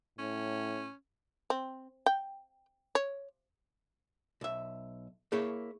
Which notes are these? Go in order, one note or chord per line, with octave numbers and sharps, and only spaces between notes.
A2 C#4
C4
G5
C#5
B1 E5
A#3 E4 G#4 C#5